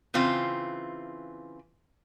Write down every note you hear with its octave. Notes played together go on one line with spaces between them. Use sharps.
C#3 E3 C4 F4